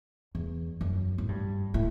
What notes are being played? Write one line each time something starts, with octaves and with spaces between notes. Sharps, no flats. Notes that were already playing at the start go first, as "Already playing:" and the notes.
E2
F#2
A2
G2
A2